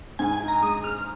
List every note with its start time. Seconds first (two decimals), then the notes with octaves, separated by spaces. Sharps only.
0.19 G#2 G#5
0.33 G#5
0.40 D#4
0.48 A#5
0.62 G#3 D#6
0.83 G#4 F6